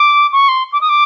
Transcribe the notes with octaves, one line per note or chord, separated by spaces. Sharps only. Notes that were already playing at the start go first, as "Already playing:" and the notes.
Already playing: D6
C#6
C6
D6
D#6
D6